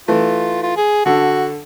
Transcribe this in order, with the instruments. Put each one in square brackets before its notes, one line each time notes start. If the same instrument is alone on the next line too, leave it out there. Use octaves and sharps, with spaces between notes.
[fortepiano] E3 A3 [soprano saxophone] F4
[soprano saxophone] F4
G#4
[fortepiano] D3 A4 [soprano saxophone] F#4